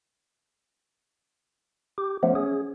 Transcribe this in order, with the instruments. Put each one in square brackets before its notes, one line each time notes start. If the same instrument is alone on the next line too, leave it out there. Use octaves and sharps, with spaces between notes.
[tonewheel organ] G4
[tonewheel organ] F3 A3 B3 [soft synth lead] C#4
[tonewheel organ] G#4